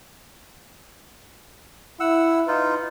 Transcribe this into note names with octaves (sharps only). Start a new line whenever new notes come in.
E4 F#5 E6
D#4 F4 B4